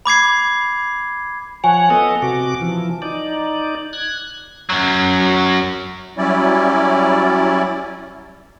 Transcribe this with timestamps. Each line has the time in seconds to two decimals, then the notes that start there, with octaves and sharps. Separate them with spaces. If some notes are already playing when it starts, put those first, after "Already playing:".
0.06 B5 D6 G#6 C7
1.64 F3 C#5 F#5 G#5
1.90 B3 A4 D#5
2.22 C3 F#4 D6
2.61 E3 F3
3.02 D#4 D5
3.93 F#6 G#6
4.69 F#2 F#3
6.17 F#3 G3 C#4 E4 D5